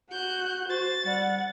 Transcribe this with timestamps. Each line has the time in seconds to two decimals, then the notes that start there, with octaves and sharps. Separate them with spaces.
0.11 F#4 F#6 G6
0.69 F#4 C5 A6
1.06 G3 F#5